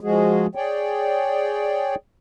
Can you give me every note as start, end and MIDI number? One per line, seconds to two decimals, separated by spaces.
0.01 0.47 53
0.01 0.47 56
0.01 0.47 66
0.01 0.47 68
0.55 1.95 68
0.55 1.95 73
0.55 1.95 74
0.55 1.95 79